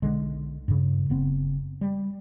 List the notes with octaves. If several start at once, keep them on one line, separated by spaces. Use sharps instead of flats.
B1 D3 G#3
G2 C#3
F#1 C#3 B3 C4
G3